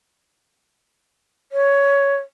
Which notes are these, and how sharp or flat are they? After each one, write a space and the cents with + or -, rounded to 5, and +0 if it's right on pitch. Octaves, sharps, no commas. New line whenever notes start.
C#5 +10